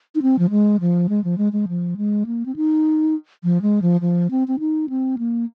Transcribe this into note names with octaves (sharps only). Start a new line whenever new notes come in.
D#4
C4
F3
G#3
F3
G#3
F3
G#3
G#3
F3
G#3
A#3
C4
D#4
F3
G#3
F3
F3
C4
C4
D#4
C4
A#3